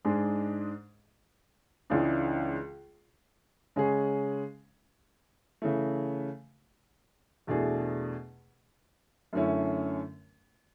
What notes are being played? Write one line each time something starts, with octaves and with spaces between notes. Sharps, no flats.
G#2 G#3 D4 G#4
C#2 C#3 E3 G#3 D4
C#3 G#3 C#4 G#4
C#3 E3 A3
E2 B2 A3 D4 G#4
F#2 D3 A3 C#4 E4